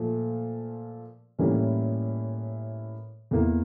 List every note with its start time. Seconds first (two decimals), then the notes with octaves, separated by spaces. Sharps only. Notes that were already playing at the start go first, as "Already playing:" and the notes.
Already playing: A#2 F3 A3
1.39 A2 E3 G3 A#3 C#4
3.31 E2 E3 A#3